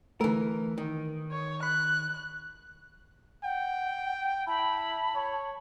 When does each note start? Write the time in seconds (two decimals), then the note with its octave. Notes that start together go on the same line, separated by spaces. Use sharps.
0.21 D3 E3 A3 A#4
0.78 D#3
1.32 C#5
1.63 B5 F#6
3.44 F#5 G5
4.47 E4 A5 B5
5.15 C#5